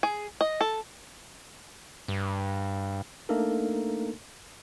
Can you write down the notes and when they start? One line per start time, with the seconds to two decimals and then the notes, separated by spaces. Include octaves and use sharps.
0.03 G#4
0.41 D#5
0.61 A4
2.08 G2
3.29 A3 A#3 D4 D#4 A4 A#4